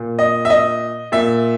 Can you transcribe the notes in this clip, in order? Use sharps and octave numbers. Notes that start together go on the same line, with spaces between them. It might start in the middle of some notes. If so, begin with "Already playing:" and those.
Already playing: A#2
D#5
E5
D#5
A#2 E5